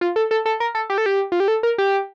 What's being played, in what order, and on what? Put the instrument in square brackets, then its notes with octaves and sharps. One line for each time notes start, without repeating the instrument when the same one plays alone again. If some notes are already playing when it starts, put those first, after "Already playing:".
[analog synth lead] F4
A4
A4
A4
A#4
A4
G4
A4
G4
F4
G4
A4
A#4
G4